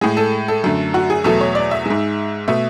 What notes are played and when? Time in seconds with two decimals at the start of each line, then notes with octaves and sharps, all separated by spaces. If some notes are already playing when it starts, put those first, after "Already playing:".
0.01 A2 G#3 G#4
0.17 A4
0.48 A4
0.64 F#2 D3 A3
0.94 F#4
1.10 G#4
1.24 E2 B2 F#3 A3 A4
1.41 C#5
1.55 D5
1.71 E5
1.86 G#2 G#3
2.48 B2 A3 E5